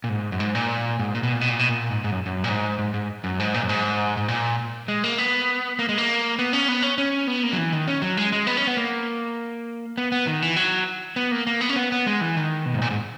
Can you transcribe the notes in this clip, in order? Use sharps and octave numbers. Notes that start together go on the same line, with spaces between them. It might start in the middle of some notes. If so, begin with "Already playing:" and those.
A#2
G#2
F#2
G#2
A#2
G#2
A#2
B2
A#2
B2
A#2
B2
A#2
G#2
G#2
F#2
F#2
A#2
G#2
G#2
G#2
F#2
G#2
A#2
F#2
G#2
G#2
A#2
G#3
A#3
B3
A#3
G#3
A#3
B3
C#4
B3
C#4
C#4
B3
A#3
F#3
E3
D#3
C#4
F#3
G#3
G#3
B3
C#4
B3
A#3
B3
B3
D#3
E3
F#3
B3
A#3
A#3
B3
C#4
B3
B3
G#3
E3
D#3
B2
G#2
A#2
G#2